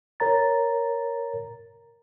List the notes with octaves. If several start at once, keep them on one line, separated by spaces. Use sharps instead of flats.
A#4 C#5 A#5 A6